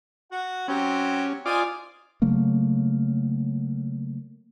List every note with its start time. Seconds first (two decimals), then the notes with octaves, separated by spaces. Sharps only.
0.31 F#4 F#5
0.68 F#3 C4 C#4 G4
1.46 F4 C5 D5 D#5 G#5
2.22 C#3 F#3 A3 A#3